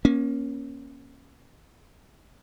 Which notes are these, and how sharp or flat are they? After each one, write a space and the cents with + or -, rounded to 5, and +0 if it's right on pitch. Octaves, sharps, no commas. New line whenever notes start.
A#3 +25 C#4 -5